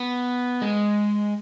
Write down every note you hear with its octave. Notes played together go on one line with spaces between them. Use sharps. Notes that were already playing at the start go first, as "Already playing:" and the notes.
Already playing: B3
G#3